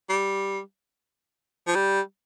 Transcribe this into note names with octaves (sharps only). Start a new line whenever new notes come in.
G3
F3
G3